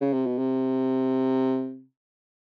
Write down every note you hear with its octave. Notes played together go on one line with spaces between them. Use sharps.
C#3
C3
B2
C3